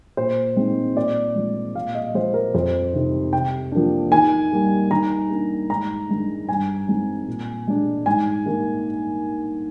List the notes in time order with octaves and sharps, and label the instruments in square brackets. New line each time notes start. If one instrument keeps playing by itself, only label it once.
[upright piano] A#2 C5
G#3 C4 D#4
A#2 D5
F3 G#3
A#2 F5
D#5
F3 G#3 C5
A#4
F2 C5
C3 D#3
C3 G5
F3 A#3 D4
D#3 G#5
G3 A#3 D#4
D#3 A#5
A#3 D4
G#2 A#5
D#3 G#3 D4
G2 G#5
D#3 G#3 C4
A#2
G#3 D4
G#2 G#5
D#3 A#3